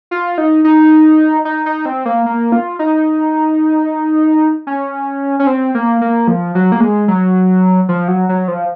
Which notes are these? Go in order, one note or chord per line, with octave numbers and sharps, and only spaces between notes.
F4
D#4
D#4
D#4
D#4
C4
A#3
A#3
F4
D#4
C#4
C#4
C4
A#3
A#3
F3
F#3
A#3
G#3
F#3
F3
F#3
F#3
F3